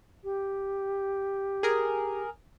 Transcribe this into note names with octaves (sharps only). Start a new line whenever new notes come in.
G4
G#4 A#4